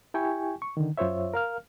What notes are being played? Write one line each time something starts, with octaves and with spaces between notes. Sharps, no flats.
E4 G4 G5 G#5 C#6
C#6
D3 D#3
F#2 F4 C5 C#5 E5
A#4 F5 F6